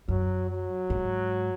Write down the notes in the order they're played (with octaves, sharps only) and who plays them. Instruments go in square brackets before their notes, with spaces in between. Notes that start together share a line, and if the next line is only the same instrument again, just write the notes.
[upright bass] F#2 [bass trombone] F#3
[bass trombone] F#3
[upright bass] G#2